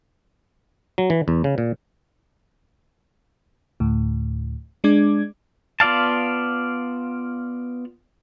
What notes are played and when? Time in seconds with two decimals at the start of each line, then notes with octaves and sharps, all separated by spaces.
0.98 F#3
1.10 E3
1.28 E2
1.44 C#3
1.58 A#2
3.80 D2 A2
4.84 G#3 D4 D6 G#6
5.80 B3 F4 D5 F5 A5